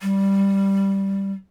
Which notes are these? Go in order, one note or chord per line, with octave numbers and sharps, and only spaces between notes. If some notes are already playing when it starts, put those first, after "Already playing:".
G3